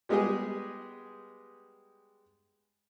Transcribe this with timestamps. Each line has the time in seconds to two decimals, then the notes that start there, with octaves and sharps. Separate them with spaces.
0.09 G3 G#3 B3 G4 G#4 D#5